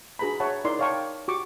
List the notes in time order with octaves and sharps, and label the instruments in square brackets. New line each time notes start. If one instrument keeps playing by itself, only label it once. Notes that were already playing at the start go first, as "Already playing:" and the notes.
[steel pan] D4 F#4 G#4 B4 A#5 B5
C#5 E5 F#5 A5 B5
D#4 E4 A#4 D5 C6
C#5 D5 F5 G5 A5 C#6
F#4 G4 C#6 D6